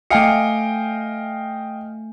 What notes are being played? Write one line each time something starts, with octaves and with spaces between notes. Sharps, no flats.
A3 D#5 F5 G5 G#5 C#7